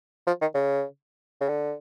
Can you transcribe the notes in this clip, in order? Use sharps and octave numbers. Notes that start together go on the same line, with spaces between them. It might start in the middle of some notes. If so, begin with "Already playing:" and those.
F3
D#3
C#3
C#3
D3